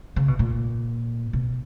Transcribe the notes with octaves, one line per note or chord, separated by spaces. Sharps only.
C#3
B2
A#2
B2